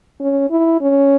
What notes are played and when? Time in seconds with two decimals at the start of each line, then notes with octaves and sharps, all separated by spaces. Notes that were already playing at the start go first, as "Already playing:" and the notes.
0.21 C#4
0.51 E4
0.81 C#4